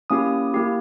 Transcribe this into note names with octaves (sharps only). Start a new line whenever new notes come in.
A#3 C#4 E4 G4 D#6
A#3 E4 G4